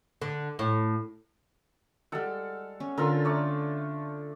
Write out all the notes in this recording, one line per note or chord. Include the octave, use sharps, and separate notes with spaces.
D3
A2
G3 G#3 A4 F5 F#5
C#4
D3 C#4 F4 A4 A#4
A3 D5 C#6